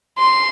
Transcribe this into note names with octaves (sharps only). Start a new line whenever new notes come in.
C6